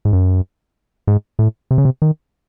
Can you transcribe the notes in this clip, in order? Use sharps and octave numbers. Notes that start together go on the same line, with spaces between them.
G#2
F#2
G#2
A2
C3
C#3
C3
D#3